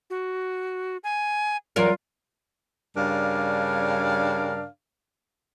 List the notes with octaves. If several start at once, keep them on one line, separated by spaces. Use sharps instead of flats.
F#4
G#5
E2 F#3 F4 A#4
G2 C#3 D4 A#4 D5 F5